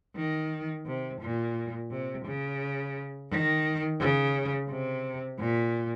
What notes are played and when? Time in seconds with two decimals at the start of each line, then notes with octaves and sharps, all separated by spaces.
0.16 D#3
0.86 C3
1.21 A#2
1.90 C3
2.25 C#3
3.30 D#3
4.00 C#3
4.69 C3
5.39 A#2